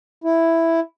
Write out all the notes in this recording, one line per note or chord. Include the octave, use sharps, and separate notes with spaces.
E4